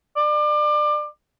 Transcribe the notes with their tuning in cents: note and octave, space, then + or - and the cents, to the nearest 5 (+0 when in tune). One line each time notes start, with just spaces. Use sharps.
D5 +30